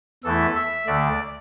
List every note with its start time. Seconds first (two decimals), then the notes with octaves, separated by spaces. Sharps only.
0.24 E2 E3 A3 E4 A4
0.56 E5
0.87 D2 D3 A3 D5